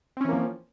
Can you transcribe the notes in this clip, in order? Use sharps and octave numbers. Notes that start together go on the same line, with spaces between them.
E3 F3 A#3 C4 C#4